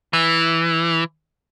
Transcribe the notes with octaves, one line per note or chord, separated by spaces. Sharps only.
E3